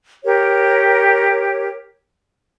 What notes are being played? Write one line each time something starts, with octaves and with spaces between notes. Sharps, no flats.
G4 A#4 C#5